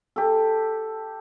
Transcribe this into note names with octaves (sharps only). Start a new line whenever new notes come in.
G4 A4